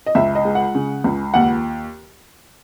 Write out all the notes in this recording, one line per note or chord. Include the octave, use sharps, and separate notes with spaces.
D#5
C#2 E5
D#5
G#3
F#5
C#3
C#2
D#2 F#5